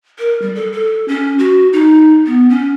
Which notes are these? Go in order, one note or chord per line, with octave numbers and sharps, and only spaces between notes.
A#4
G3
A4
A4
C#4
F#4
D#4
B3
C#4